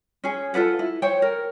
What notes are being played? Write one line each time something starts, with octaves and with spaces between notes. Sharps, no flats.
C#4 G#4
F4 A4 B4 F#5
E4
C5 C#5 G5
A#4